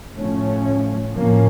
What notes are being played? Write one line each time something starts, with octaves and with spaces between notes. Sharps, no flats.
A2 F3 A3 C#4
A2 F3 A#3 C#4